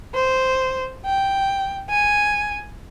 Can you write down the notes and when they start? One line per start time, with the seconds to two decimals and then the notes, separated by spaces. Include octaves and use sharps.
0.14 C5
1.05 G5
1.90 G#5